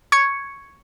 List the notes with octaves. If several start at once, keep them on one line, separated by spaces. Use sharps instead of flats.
C#6 G#6 C#7